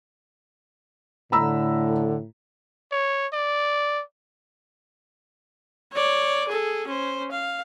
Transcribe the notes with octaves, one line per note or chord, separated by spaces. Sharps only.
A2 D3 A#5 B5 E6
C#5
D5
C#5 D5
G#4 A4
C#4 C5
F5